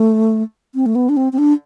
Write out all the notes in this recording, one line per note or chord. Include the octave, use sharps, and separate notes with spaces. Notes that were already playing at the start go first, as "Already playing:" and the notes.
Already playing: A3
C4
A3
B3
D4
C4
C4
D4